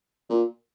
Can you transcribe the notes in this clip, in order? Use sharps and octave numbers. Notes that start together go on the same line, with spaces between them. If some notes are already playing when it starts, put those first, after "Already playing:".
A#2